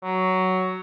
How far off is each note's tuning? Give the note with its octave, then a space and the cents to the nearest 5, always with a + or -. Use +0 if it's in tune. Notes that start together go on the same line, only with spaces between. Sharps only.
F#3 +10